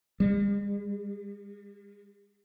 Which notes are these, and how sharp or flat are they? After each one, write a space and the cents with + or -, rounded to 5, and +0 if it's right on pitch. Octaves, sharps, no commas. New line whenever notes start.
G#3 -45